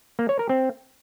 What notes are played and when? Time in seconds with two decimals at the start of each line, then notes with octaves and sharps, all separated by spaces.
0.19 A#3
0.29 C#5
0.39 A#4
0.49 C4